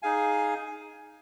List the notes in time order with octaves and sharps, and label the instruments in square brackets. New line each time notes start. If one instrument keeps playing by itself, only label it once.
[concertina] D#4 G#4 F5 G#5